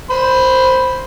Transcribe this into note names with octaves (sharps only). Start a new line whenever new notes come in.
C5 B5 C6